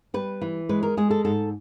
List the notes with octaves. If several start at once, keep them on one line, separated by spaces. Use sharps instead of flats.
G3 B4
E3
G#3 B4
A#4
G#3 G#4
A4
G#2 A4